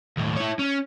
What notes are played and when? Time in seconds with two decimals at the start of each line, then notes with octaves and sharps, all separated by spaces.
0.17 D#2 A2
0.37 E4 C#5
0.59 C#4